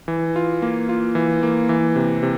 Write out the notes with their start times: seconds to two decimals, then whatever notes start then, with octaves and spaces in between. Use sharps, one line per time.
0.08 E3
0.36 F4
0.62 A#3
0.89 F4
1.15 E3
1.43 A#3
1.69 E3
1.96 C3
2.23 C3